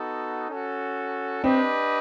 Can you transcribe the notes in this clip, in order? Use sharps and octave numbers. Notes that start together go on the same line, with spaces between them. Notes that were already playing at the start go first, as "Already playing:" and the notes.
Already playing: B3 D#4 F#4 A4
C#4 F#4 A4
C4 D4 G4 B4 D#5